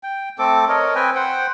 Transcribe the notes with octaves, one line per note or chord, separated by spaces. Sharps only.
G5
A3 C4 A4 D6
A#4 C#5 D#5
C4 B4 G5 G#5
C5 F#5 G5